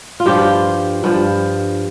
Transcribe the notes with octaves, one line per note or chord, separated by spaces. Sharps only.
F4
G2 F3 G4
G2 F3